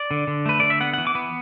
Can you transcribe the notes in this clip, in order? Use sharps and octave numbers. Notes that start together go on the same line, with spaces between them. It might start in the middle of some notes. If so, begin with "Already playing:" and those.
Already playing: D5
D3
D3
A3 B4
D3 D5
E5
B3 F#5
E3 F#5
D6
B3